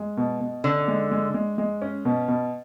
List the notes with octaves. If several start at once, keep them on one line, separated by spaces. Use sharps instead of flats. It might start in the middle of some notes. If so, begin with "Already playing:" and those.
Already playing: G#3
B2
B2
D3 C#4
G#3
G#3
G#3
G#3
C#4
B2
B2